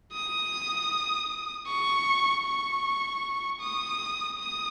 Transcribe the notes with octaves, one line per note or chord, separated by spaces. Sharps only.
D#6
C#6
C#6
D#6
D#6